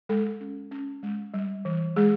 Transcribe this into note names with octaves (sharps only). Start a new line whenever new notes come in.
G#3 A4
C#4
C#4
G#3
G3
E3
G#3 G#4